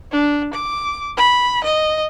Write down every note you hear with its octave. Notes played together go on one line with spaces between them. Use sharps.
D4
D6
B5
D#5